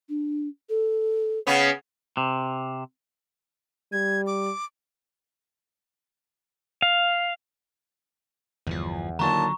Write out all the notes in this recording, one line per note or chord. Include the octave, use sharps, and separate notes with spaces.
D4
A4
C#3 B3 C#4
C3
G3 G#6
D6
F5
G1 E2 F3
D#2 A#2 D3 F#3 A5 A#5 C#6